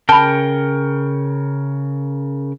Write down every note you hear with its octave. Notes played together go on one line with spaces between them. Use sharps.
C#3 A#4 G5 A5 B5